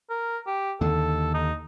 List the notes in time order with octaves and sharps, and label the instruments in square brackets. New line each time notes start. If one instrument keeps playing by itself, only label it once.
[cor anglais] A#4
G4
[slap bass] D#2 D3 [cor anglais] A4
[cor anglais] D#4